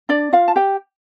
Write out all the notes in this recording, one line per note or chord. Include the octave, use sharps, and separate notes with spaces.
D4 D5
F4 F5
A5
G4 G5